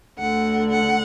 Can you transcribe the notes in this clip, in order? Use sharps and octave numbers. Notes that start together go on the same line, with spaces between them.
D2 D3 F#5
F#5